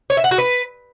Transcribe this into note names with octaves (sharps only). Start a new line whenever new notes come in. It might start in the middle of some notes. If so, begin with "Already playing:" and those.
C#5
E5
F#5
F#4
B4